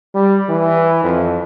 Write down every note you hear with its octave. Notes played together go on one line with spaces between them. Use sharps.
G3
E3
F2